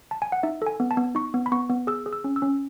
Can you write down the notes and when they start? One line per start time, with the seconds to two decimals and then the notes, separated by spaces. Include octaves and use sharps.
0.11 A5
0.22 G#5
0.32 F#5
0.43 D#4 E5
0.62 A4 G#5
0.80 B3
0.91 A5
0.97 B3
1.15 D#4 C#6
1.34 B3
1.46 B5
1.52 B3 C#6
1.70 B3
1.87 G#4 E6
2.06 G#4
2.13 E6
2.24 C#4
2.36 E6
2.42 C#4